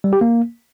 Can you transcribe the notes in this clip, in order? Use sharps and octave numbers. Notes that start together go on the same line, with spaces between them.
G3
G4
A#3